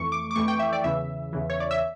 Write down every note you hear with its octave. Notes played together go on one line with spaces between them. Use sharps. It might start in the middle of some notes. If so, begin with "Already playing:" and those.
Already playing: F2 E3 A3 C#6
D6
D6
F2 E3 A3 C#6
G5
E5
D5
E2 C#3 E3 E5
E2 C#3 E3
C#5
D5
E5